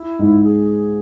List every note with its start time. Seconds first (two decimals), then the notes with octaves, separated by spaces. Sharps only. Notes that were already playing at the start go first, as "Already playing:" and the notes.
Already playing: E4
0.19 G#2
0.44 G#4